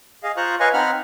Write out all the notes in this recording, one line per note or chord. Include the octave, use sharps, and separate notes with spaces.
G#4 D#5 F5
F4 C5 A#5 C#6 F#6
B4 C#5 D#5 F5 G#5 C#6
C4 D#4 F#5 B5 F6